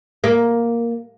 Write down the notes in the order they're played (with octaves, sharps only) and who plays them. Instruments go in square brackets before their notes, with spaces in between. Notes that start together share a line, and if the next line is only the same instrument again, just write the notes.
[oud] A#3